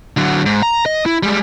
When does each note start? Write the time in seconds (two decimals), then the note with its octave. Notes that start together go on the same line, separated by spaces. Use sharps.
0.17 D3 F#3
0.46 G#2
0.63 A#5
0.86 D#5
1.06 E4
1.23 G3 G#3